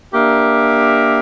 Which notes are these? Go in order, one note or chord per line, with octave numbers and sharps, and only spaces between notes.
A#3 D4 G4 A#4 E5